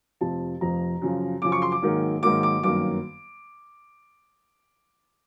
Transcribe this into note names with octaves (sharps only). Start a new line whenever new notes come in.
F1 F2 C3 F3 A5
F1 F2 C3 F3 A#5
F#2 C#3 F3
F#2 C#3 F3 D6
C#6
C6
D6
G#2 D#3 F#3 A#3
G#2 D#3 F#3 A#3 D6
D6
G1 F#2 D#3 F#3 A#3 D6